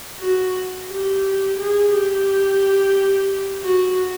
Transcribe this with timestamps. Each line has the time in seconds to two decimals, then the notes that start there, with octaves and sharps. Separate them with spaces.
0.19 F#4
0.88 G4
1.58 G#4
1.92 G4
3.63 F#4